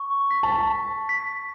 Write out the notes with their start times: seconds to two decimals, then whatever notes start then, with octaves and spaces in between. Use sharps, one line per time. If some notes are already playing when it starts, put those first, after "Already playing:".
Already playing: C#6
0.31 B6
0.43 A5
0.70 B6
1.09 B6